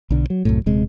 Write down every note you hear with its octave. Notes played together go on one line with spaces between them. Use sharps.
B1 D3
F#3
C2 F#2 A2
D#1 C3 G#3